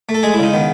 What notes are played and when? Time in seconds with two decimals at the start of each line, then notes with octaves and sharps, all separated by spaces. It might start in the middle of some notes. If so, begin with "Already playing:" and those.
0.09 A3
0.15 A4
0.23 G#3 G#4
0.34 E4
0.39 C#3 D#4
0.53 D#3 B3